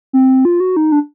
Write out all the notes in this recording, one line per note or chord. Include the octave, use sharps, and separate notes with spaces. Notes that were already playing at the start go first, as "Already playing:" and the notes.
C4
F4
F#4
D#4
D4